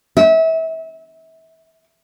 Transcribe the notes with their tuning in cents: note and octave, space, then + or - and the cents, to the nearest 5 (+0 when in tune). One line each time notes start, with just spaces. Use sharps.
E5 -30